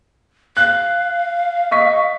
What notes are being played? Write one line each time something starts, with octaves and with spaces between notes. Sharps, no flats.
F5 F#6
D#5 C#6 B6